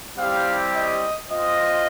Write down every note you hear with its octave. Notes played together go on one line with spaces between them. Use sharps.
G3 C4 E4 G4 F5
D#5
C4 F4 D#5